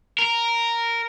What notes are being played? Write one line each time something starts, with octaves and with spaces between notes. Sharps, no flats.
A#4